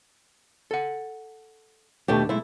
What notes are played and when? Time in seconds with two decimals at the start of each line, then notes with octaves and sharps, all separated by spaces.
0.71 A4 F#5
2.08 D#2 B2 A3 D4 G4
2.29 B1 G#3 A3 E4